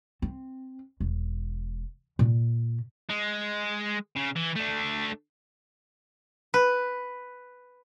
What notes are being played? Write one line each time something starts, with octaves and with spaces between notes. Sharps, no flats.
C4
E1
A#2
G#3
C#3
E3
A3 D4
B4